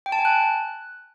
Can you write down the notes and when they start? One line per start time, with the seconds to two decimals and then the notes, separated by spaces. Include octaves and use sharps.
0.06 G5
0.12 A5
0.19 G#5
0.25 F#6